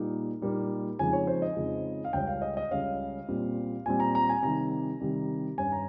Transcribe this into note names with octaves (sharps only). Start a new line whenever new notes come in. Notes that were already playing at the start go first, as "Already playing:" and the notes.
Already playing: A#2 G3 A#3 D#4
A#2 G3 A#3 D#4
F2 C#3 F3 G#3 D#4 G#5
C#5
C5
D#5
F2 C#3 F3 G#3 D#4
F5
C#2 C#3 G3 C#4 G5
F5
D#5
D#5
C#2 C#3 G3 C#4 F5
A#2 G3 C4
A#2 G3 C4 G#5
A#5
A#5
G#5
C3 D#3 G3 A#5
C3 D#3 G3
G2 G3 C#4 G#5
A#5